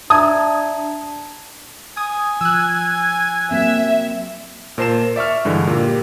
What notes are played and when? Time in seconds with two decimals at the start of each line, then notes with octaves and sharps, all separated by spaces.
0.10 D4 E5 A5 A#5 D#6 G#6
1.97 G#5 D#6
2.41 F3 E6 F#6
3.51 F#3 A#3 C4 E5
4.78 A#2 A#4 C5 A5 C7 E7
5.16 D5 E5 C#6 F6
5.45 G2 D3 E3 G#3
5.67 A#2 G4